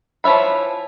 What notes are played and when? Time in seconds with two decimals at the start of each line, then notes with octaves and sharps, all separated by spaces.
0.24 E3 F3 C#5 E5 B5